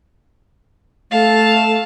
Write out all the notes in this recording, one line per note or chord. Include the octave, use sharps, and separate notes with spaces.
A3 F5 A5